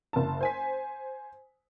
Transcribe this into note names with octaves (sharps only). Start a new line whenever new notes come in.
F#1 A5
C5 G#5 B6